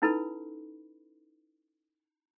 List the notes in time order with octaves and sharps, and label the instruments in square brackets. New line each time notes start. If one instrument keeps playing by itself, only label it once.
[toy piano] C#4 D#4 E4 A4 B4 B5